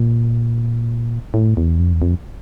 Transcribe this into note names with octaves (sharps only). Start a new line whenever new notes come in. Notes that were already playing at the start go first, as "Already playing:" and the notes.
Already playing: A#2
A2
E2
F2
E2
F2